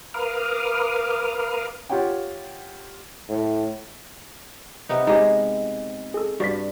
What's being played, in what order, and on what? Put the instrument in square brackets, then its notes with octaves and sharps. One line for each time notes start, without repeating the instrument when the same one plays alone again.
[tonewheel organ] A#4 B4 F5 D6 D#6 F6
[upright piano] F4 G4 C#5 F#5 G5
[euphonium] A2
[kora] C3 B3 D#4
[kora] G#3 [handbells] D#4 G4 C5
[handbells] G#4 A4
[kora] G2 [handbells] F#4 D5 B6